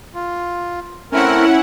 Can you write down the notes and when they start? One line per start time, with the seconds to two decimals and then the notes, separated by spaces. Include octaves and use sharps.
0.15 F4
1.12 A3 C4 C#4 E4 A#4 F#5